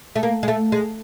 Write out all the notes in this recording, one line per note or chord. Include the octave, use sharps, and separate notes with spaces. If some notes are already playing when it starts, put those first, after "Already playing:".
A3
A#3
G#3
A3
G#3